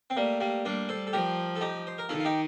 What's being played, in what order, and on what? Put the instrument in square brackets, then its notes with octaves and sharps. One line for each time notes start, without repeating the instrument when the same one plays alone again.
[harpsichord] C4
[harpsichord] G3 A#3 [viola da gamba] A3
[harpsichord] G3 A#3
[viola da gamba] G3 [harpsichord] A#3 D4
[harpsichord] A4 C5
A4
[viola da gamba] F3 [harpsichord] G4 A#4
[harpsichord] A4
D#4 G4
C5
A#4
[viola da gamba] D#3 [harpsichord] F4 A4
[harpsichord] F4
D#4 G4